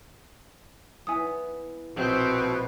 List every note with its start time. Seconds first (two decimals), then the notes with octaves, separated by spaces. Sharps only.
1.07 B3 E4 G#5 D#6
1.96 A#1 B2 C4